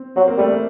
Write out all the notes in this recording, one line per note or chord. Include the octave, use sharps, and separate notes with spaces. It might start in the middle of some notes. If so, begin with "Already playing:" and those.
Already playing: C4
F#3 C4
A#3
G3 A3
A#3